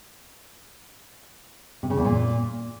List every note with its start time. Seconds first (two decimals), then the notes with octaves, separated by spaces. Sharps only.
1.83 C3
1.90 C#3
1.97 E2
2.05 A#2